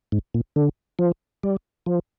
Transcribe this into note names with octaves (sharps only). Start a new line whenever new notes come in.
G#2
A#2
D3
F3
G3
F3